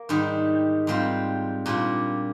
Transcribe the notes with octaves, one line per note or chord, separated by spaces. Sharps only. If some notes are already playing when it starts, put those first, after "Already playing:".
Already playing: A#3
G#2 D#3 G3
G#2 G3 C4 F4
A#2 G3 D4 F4